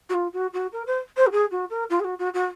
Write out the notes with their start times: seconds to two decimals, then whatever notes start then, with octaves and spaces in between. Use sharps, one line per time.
0.09 F#4
0.14 F4
0.33 F#4
0.53 F#4
0.72 A#4
0.87 C5
1.17 C5
1.26 F#4
1.32 G#4
1.51 F#4
1.70 A#4
1.90 F4
2.00 G#4
2.04 F#4
2.19 F#4
2.34 F#4